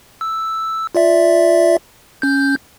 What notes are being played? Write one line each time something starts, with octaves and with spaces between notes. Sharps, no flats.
E6
F4 D5 E5
C#4 G6